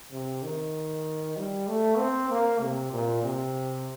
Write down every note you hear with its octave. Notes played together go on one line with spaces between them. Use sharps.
C3
D#3
G3
A3
C4
A#3
C3
A#2
C3